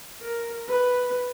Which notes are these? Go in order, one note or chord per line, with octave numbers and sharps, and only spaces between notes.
A#4
B4